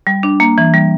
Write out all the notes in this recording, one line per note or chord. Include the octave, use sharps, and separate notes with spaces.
G3
D4
A#3
E3
G3